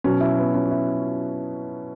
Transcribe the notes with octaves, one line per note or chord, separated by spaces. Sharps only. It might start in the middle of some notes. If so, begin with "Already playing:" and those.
B2 F#3 C#4
E4
B3
C#4
E4